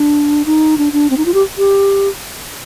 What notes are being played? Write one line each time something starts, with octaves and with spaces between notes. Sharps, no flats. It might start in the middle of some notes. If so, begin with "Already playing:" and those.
Already playing: D4
D#4
D4
D4
C4
D#4
F4
G4
G4